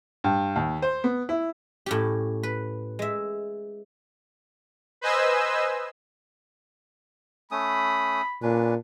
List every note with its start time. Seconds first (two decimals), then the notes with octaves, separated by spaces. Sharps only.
0.24 G2
0.56 D#2
0.82 C5
1.04 B3
1.29 E4
1.86 A2 C#4 G4
2.43 B4
2.99 G#3 E5
5.01 B4 C5 D#5 G#5 E6
7.51 A3 C#4 B5 D#6
8.43 A#2 C#4 D4 B4